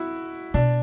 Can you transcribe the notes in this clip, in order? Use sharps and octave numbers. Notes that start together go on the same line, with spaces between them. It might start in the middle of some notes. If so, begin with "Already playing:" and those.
Already playing: E4 F#4
B2 D4